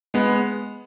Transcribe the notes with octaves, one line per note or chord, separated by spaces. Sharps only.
G#3 B3